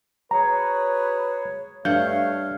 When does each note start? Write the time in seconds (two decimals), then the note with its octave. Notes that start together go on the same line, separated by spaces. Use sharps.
0.31 F#4 G#4 B4 C#5 A#5
1.85 G2 A3 C#5 F5 F#5 G6